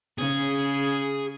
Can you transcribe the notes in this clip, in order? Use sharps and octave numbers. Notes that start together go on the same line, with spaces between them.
C#3 G#4